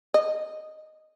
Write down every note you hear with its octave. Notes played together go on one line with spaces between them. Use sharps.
D#5